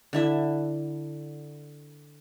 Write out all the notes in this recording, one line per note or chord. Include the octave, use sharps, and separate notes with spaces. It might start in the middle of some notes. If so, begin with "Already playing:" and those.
D3 E4 E5